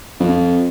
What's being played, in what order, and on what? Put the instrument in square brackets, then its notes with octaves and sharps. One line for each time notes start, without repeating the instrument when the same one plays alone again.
[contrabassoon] F2